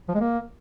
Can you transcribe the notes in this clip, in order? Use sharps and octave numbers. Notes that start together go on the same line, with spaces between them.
F3
G#3
A#3